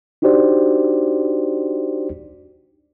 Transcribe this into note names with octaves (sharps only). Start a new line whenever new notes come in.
D4 D#4 F#4 G4 C5 D5